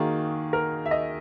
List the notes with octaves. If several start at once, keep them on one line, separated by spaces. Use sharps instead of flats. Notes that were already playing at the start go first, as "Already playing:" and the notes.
Already playing: D#3 A#3 D#4 F#4 G#4
A#4
E5
D#5